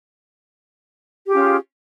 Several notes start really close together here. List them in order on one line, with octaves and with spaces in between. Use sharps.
G4 G#4 F4 C#4